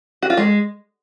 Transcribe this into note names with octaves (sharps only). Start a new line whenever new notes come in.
F#4
F4
G#3